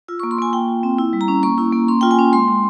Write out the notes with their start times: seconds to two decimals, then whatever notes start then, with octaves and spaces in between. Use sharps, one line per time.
0.08 F4 E6
0.20 A#3 C#6
0.31 C6
0.38 A#3 G#5
0.53 F4 G5
0.69 F4
0.83 C4
0.98 E4
1.13 G3
1.21 A#5
1.28 C#4
1.43 A#3 C#6
1.58 E4
1.73 A#3
1.88 C#4 C6
2.01 F4 G5
2.11 G#5
2.18 C#4
2.33 G#3 C6
2.48 G#3